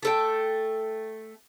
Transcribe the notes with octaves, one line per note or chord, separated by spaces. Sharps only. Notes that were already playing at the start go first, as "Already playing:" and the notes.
A3 A4 G5